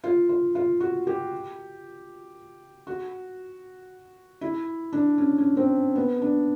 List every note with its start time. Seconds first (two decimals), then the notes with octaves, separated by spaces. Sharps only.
0.04 F4
0.29 F4
0.55 F4
0.80 F#4
1.07 G4
2.87 F#4
4.41 E4
4.93 D4
5.18 C#4
5.38 C#4
5.57 C4
5.96 B3
6.21 D4